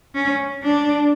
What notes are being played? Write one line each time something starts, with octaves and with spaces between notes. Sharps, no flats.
C#4
D4